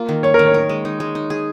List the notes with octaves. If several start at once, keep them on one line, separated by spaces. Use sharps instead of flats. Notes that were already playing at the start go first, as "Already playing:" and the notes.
Already playing: A#3 F4
D#3
C#4 C#5
A#4
D#3
C#5
A#4
G#3
D#4
G#3
D#4
G#4